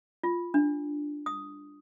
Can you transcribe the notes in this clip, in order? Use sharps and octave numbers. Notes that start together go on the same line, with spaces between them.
F4
D4
D#6